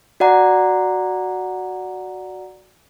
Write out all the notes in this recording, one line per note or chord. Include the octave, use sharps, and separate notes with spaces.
F#4 D5 F#5 A#5